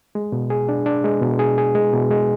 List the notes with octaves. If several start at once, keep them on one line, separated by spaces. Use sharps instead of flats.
G#3
B2
G#4
D4
D4
G#3
B2
G#4
G#4
G#3
B2
G#3